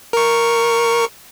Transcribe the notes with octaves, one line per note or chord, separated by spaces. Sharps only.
A#4 C#6